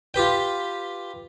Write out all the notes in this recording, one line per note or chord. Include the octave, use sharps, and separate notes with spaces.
F4 G4 B4 G5